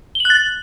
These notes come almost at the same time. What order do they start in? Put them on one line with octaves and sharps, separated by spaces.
G7 F#7 F#6 A6